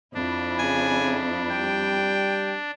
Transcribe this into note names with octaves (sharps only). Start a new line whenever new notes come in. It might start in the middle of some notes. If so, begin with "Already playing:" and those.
F2 D4 E4
C#3 G#5
G3 G5